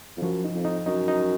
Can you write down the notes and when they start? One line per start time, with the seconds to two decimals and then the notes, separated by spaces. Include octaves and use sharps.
0.17 F2
0.22 F#2 F3
0.44 D#4
0.55 F2
0.65 D#4
0.86 F#2 D#4
1.08 D#4